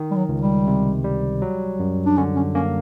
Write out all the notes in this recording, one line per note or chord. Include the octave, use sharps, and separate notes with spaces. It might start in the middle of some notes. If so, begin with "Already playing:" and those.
Already playing: D#3
G3
F#3
C#2
G3
C3
G3
F#3
F#2
D4
D3 C#4
C#4
A#3 C#4